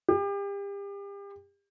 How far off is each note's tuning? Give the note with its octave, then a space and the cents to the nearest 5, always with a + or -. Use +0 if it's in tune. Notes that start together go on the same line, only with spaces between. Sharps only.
G4 +35